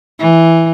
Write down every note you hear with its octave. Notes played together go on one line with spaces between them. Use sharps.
E3